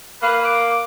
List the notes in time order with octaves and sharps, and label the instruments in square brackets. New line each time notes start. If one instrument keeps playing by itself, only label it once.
[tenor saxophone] A#3 [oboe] B4
[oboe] D6